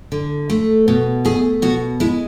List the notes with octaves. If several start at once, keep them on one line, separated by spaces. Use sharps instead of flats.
D3
A3
B2
A3 G#4
B2 F#4
G#3 E4